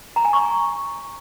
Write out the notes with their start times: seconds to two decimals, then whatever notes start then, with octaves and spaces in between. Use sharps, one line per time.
0.16 A#5
0.25 G#5
0.33 C#6